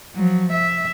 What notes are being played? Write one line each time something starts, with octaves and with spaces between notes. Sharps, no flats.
F3 F#3
E5